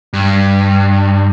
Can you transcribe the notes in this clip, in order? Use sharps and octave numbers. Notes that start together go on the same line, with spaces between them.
G2